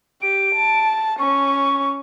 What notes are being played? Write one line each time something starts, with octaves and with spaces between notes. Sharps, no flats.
G4 D7
A5
C#4 C#6